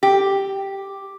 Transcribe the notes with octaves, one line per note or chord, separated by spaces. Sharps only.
G4